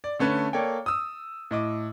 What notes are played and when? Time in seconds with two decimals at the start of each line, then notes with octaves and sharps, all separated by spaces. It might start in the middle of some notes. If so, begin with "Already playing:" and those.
0.04 D5
0.19 D3 A3 C#4 B4
0.53 A#3 A4 C#5 D5 G5
0.86 D#6 E6
1.51 A2 D#5 D6